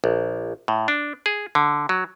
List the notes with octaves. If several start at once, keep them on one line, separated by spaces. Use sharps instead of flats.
A#1
A2
D4
G#4
D3
F#3